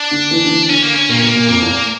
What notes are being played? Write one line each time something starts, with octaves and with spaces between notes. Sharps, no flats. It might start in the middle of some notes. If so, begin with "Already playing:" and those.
Already playing: D4
D3
E3
D3
E3
D3 C#4
A#3
C#4
A#2 A#3
C#4
A#2 A#3
A#2
F2 A#3
E2